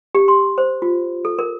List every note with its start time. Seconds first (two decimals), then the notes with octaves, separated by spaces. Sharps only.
0.15 G4
0.28 C6
0.58 C5
0.82 F4
1.25 A4
1.39 A#4